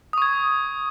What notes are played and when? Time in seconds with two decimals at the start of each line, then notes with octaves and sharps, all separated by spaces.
0.13 D#6
0.18 C#6
0.22 G#6